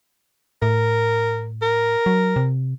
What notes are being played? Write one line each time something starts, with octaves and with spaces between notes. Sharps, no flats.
A2 A#4
A#4
F#3
C3